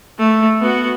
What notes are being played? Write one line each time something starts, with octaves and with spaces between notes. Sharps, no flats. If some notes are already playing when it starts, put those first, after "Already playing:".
A3
B3 F#4